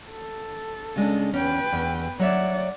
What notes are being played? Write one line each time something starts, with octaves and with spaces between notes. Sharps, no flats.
A4
C#3 G#3 D4
E2 C#4 B4 G5
E2
F#3 C#5 D5 E5 F#5